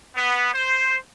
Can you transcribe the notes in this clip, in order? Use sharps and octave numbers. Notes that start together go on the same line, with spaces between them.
B3
C5